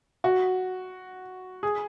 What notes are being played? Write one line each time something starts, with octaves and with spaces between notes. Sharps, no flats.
F#4
G#4